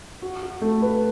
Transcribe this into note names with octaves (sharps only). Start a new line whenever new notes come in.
F#4
F#4
A3
B4